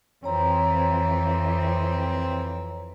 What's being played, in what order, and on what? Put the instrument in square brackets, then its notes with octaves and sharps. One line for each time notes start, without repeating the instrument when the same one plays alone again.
[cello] F2 E3 [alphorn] C4 [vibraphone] C#5 A#5